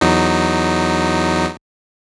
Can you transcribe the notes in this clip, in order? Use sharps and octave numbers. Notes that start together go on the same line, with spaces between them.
E2 F#3 D#4